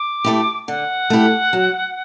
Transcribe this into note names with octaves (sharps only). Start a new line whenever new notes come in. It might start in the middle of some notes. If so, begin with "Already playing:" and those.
Already playing: D6
A3 E4 G4
D3 F#5
A3 E4 G4
F#3